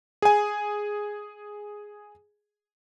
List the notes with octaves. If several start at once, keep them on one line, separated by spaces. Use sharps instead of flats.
G#4 G#5